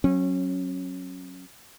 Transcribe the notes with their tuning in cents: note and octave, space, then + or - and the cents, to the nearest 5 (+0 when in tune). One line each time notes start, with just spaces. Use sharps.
F#3 +0 C#4 -20